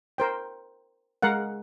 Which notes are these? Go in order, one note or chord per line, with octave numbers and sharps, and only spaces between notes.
A#4 C5 G5
G#3 A#4 F5 F#5